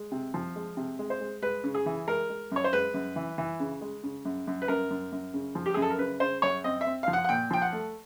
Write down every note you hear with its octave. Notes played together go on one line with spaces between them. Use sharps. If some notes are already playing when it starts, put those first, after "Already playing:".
Already playing: G#3
C3
F3
G#3
C3
G#3
C5
G#3
G#3 B4
C#3
G#4
E3
G#3 A#4
G#3
F#2 C#5
C5
G#3 B4
F#2
E3
E3
C#3
G#3
C#3
F#2
F#2
B4
F#2 A#4
F#2
F#2
C#3
F3
G4
F#2 G#4
A4
A#4
C#3 B4
C#3 C5
F#2 C#5
C4 D#5
E5
C4
F3 F5
F#5
F#5
A#2 G5
F3 G5
F#5
A3